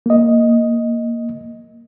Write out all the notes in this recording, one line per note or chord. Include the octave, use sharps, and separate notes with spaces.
A#3 D#5